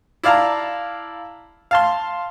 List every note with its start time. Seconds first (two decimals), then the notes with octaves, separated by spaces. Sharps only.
0.23 E4 D5 F5 A5 A#5
1.71 F5 A5 C6